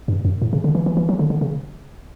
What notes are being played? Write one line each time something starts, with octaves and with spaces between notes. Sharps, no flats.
G2
F#2
A2
C#3
D3
E3
E3
E3
F#3
D3
D3
C#3